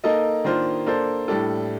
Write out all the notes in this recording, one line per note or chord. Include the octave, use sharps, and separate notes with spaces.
A#3 D#4 A4 D#5
D#3 A#3 D4 F4 C5
A#3 D4 A4 C5
A2 G3 D4 A4